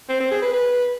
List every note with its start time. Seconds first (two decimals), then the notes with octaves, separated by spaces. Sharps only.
0.09 C4
0.20 C4
0.31 G#4
0.42 B4
0.53 B4